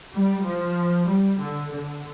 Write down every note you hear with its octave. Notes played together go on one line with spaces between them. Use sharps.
G3
F3
G3
D3
D3